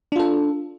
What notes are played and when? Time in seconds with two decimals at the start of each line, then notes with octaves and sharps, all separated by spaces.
0.12 D4
0.16 F4
0.19 A4